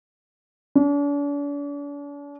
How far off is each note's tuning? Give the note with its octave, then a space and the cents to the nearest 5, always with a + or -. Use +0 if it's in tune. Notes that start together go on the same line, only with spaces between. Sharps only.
D4 -45